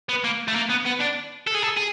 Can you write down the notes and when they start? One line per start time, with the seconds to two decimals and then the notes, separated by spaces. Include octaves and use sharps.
0.09 B3
0.24 A#3
0.48 A3
0.56 A#3
0.70 B3
0.86 B3
1.01 D4
1.47 A4
1.55 G#4
1.63 A4
1.77 G#4